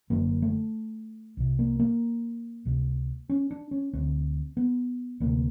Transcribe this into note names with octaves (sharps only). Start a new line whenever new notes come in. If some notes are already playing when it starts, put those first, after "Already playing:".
F#1 F#2 D3 A#3
A3
C2 C3
A#3
A#3
C#2 C3
C#4
D4
C#4
D2 D3 C4
B3
D2 C3 A#3